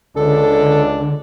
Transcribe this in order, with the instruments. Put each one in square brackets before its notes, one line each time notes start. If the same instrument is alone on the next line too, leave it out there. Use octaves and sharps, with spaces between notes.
[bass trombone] C#2 [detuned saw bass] D3 [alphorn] D4 [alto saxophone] A4